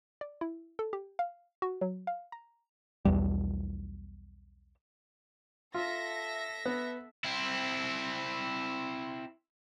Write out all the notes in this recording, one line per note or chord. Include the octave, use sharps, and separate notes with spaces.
D5
E4
A4
G4
F5
F#4
F#3
F5
A#5
B1 E2 G3
F4 A4 E5 A#6
B3
C4 E4